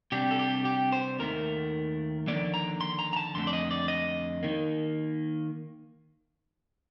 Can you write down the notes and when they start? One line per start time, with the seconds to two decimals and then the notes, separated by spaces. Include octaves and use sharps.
0.12 C3 G3 D4 G4
0.31 A4
0.39 G4
0.65 G4
0.92 C5
1.19 D#2 D#3 A3 A#4
2.27 D#2 D3 F3 A#3 D5
2.54 A#5
2.81 C6
2.99 A#5
3.13 A#5
3.17 A5
3.35 F2 D3 A3 C6
3.47 D5
3.53 D#5
3.71 D5
3.88 D#5
4.43 D#3 A#3